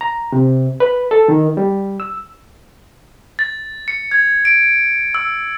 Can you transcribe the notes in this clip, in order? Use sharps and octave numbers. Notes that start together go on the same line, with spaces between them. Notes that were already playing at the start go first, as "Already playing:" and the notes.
A#5
C3
B4
A4
D#3
G3
E6
A6
C#7
G#6
D7
E6